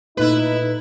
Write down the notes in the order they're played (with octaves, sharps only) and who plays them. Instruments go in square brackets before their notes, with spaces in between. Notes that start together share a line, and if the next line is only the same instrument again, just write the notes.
[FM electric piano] A#2 A3 [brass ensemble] D#4 [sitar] E4 B4